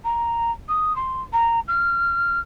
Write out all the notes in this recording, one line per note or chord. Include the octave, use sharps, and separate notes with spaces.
A#5
D#6
C6
A#5
F6